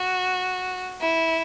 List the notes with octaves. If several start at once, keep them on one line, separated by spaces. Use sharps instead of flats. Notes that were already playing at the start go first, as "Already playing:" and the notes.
Already playing: F#4
E4